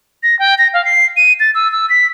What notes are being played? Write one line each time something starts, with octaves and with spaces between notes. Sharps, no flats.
A#6
G5
A#6
F5
C7
D#7
A6
E6
E6
B6